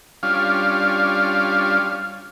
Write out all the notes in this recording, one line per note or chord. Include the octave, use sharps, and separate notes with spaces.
G3 C#4 D4 F4 F5